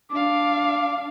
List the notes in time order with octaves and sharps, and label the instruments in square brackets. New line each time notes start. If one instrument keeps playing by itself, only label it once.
[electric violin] D4 F5 [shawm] D6